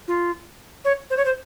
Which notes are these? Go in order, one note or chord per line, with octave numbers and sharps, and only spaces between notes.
F4
C#5
C5
C#5
C5